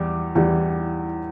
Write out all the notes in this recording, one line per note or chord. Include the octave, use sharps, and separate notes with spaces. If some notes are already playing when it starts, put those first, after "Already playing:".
Already playing: E2 E3 G3 D6
E2 E3 G3